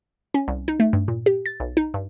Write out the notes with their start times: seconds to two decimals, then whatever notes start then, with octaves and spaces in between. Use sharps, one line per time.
0.34 C#4
0.48 C2
0.68 D#4
0.80 A3
0.93 G2
1.08 A#2
1.26 G4
1.46 A6
1.60 B1
1.77 D#4
1.94 G2